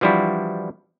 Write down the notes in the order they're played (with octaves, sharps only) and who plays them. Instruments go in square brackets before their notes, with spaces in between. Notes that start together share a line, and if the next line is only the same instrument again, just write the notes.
[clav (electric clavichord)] E3 F3 G3 D4 E4 F#4